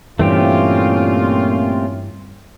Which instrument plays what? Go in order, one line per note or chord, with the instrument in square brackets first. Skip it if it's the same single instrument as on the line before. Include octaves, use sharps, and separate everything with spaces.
[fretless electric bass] G2 E3 [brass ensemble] A#2 C#4 F4 [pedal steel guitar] A3 C4 G4